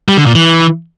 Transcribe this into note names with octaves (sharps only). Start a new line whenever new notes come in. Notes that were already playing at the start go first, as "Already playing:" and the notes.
G3
D3
A#2
E3